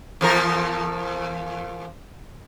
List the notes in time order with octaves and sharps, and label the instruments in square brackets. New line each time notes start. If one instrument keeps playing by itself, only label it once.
[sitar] E2 F3 A#4